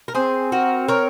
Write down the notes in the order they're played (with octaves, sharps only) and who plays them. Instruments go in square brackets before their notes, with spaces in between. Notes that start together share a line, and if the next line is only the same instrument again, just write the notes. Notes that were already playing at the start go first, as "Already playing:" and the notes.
[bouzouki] A#4
[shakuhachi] C4 [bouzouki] G#4 C5
[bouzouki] F#4 A#4
A#4 C#5